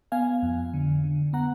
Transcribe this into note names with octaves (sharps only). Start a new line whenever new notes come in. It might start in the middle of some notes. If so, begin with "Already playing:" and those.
B3 F5 G#5
F2
D3
D3
B3 F#5 A#5